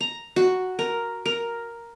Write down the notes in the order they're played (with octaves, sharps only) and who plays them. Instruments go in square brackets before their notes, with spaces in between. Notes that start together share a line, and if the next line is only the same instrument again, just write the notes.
[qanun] A#5
F#4
A#4
A#4